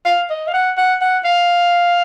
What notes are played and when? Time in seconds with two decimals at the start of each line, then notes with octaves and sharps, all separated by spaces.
0.06 F5
0.30 D#5
0.48 F5
0.54 F#5
0.78 F#5
1.01 F#5
1.25 F5